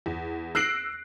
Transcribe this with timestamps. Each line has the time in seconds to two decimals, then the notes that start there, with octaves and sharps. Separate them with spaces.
0.06 E2
0.55 E6 F#6 A#6 C7 D7 F#7